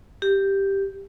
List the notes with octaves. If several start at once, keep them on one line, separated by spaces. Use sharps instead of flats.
G4